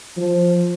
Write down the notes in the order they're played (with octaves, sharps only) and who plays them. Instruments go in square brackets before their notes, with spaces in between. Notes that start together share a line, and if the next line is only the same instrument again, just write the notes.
[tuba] F3